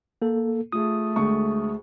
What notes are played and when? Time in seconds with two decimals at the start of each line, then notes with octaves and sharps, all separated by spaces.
0.22 A#3 A4
0.72 A3 F4 G#4 D#6
1.16 D2 G#3 C#6